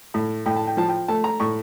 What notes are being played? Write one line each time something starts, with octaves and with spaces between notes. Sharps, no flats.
A2
A2 G5
A5
G5
F3 A5
G5
A3 A5
A#5
A2 C#6